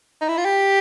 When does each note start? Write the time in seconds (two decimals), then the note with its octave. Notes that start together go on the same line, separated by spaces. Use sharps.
0.21 D#4
0.28 E4
0.38 F4
0.45 G4